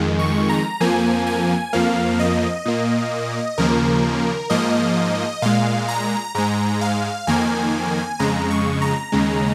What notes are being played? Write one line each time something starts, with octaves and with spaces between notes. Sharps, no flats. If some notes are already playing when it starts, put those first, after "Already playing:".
Already playing: F2 D#3 G#3
C#6
A#5
F2 F3 A#3 G#5
G#5
F2 F3 A#3 F5
D#5
A#2 A#3
D#2 C#3 F3 A#3 A#4
G#2 F3 A#3 D#5
A#2 G#3 F5
A#5
G#2 G#3 A#5
F5
F2 D#3 A#3 G#5
F2 C#3 G#3 A#5
C#6
A#5
D#2 C#3 G#3